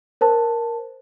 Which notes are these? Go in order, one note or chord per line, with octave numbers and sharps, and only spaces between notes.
A#4 C5 A5